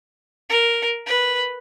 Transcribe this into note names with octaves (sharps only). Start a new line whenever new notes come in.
A#4
B4